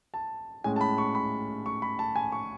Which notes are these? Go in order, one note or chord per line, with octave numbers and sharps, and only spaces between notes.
A5
A2 G#3 C#4 G#5
A5
B5
C#6
B5
C#6
B5
A5
G#5
C#6